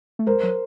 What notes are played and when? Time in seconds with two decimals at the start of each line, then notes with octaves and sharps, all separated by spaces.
0.19 A3
0.27 G#3 A#4 C5
0.43 F#3